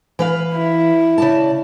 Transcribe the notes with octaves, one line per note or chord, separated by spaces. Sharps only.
E3 B4 F5
E4
C#3 D5 A5